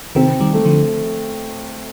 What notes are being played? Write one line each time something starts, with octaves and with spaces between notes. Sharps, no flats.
C3 D#3 C4
D#3 G3
A3
D3 F3